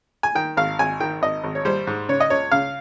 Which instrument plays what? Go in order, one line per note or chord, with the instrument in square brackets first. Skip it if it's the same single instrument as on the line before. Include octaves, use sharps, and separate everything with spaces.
[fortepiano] G#5
D#3 G5
G#1 F5
G#1 G#5
D#3 G5
G#1 D#5
G#1
C#5
G3 C5
G#2
C#3 C#5
D#5
C#2 C#5
C#3 F5